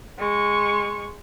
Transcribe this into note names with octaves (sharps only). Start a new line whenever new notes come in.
G#3 C#6